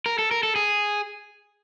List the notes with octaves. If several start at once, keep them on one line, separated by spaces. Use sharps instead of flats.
A#4
A4
A#4
A4
G#4